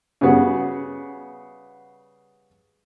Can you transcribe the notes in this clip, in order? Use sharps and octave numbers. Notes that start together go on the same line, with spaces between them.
C#3 G3 B3 F#4